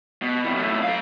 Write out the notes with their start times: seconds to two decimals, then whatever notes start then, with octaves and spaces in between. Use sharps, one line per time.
0.22 B2
0.44 C3 E3
0.56 F#2 A3
0.83 A4 F5